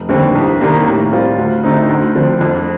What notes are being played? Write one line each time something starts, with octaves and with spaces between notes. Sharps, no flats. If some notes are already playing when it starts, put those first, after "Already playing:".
Already playing: F1
D#2 D3 G3 C4
C2
C3 D#3 G3 A#3
A2
G3 C4 F4
D2
D3 A3 C4 D#4
D2
D3 F3 C4
F2